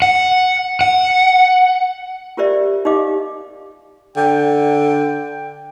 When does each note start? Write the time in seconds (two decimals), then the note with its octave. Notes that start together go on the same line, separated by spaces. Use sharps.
0.02 F#5
0.81 F#5
2.37 F4 G4 A#4 C5 D5 E5
2.85 D#4 G4 D#5 F5 D6
4.17 D3 G5